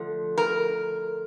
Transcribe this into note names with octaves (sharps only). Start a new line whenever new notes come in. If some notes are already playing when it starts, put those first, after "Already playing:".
Already playing: D3 F3 A3
A#4